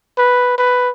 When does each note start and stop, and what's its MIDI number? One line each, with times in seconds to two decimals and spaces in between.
0.18 0.57 71
0.58 0.90 71